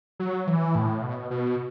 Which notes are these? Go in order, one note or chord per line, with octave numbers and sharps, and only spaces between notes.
F#3
E3
A2
B2
B2